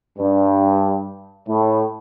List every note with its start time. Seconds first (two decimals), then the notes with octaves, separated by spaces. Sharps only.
0.19 G2
1.48 A2